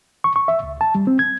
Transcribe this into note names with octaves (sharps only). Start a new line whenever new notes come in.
C#6
C#6
E5
C#2
A5
G3
C4
G#6